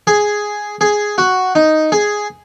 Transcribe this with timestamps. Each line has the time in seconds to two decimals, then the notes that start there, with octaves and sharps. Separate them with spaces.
0.07 G#4
0.81 G#4
1.18 F#4
1.55 D#4
1.92 G#4